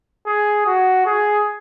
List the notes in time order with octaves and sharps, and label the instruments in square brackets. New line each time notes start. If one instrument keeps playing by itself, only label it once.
[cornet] G#4
F#4
G#4